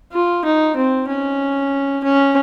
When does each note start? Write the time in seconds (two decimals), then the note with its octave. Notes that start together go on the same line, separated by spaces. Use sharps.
0.13 F4
0.45 D#4
0.76 C4
1.08 C#4
2.04 C#4